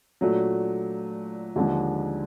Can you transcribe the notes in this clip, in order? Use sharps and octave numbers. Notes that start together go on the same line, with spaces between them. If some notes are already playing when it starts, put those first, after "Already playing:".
A#2 F#3 A3 D4
D#2 D3 F3 G#3